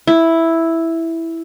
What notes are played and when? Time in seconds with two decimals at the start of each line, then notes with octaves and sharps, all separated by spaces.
0.07 E4